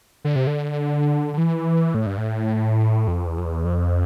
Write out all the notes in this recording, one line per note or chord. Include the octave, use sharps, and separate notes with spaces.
D3
C3
D3
D3
E3
A2
G2
A2
F2
E2
F2
E2
F2